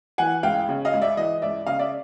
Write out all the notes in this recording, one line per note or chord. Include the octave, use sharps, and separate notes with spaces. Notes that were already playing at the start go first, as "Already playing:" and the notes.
E3 F#5 G#5
C#2 F5 G5
C#3
D#5 F5
C#2
D5 E5
E3 D#5
C#2 D5 E5
C#3 D#5 F5
D5 E5